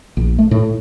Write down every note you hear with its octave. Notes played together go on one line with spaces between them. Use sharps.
A#1
A3
A2